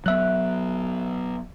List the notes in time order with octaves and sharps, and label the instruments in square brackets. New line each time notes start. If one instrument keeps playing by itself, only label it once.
[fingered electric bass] F#3 B3 [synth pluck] E5 F#6